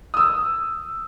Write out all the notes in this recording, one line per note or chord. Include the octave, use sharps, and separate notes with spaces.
D#6 E6